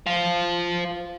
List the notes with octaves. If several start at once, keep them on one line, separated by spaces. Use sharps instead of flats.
C5 F5